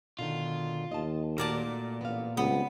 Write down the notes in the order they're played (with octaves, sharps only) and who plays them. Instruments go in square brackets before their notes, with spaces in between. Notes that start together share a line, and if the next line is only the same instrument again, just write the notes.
[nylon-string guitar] B2 D3 D#3 [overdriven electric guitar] F4
[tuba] D#2 [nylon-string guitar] D#5 A5
[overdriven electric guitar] A#2 [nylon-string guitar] A3 F#4 [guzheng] A#4 D5 A5
[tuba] A1 [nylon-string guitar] B3 F5
[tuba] C#2 [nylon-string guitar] G3 C4 G#4 [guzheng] B3